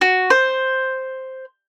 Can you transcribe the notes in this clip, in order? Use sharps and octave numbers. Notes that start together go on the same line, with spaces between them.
F#4
C5